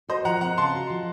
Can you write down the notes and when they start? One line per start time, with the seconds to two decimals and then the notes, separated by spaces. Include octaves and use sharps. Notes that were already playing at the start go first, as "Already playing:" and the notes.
0.08 F#4 C5 D#5
0.25 F3 F#5 A#5
0.41 C4 F#5 A#5
0.58 C#3 A5 C6
0.74 F#4
0.90 F3